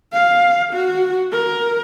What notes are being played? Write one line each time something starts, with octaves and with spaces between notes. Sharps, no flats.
F5
F#4
A#4